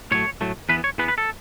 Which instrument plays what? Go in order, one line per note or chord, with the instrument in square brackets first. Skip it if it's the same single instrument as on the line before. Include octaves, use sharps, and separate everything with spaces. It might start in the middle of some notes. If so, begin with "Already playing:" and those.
[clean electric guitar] A2 F#3 A3 C#5
A2 F#3 A3
E2 E3 B3 B4
C#5
E2 E3 B3 B4
B4
A4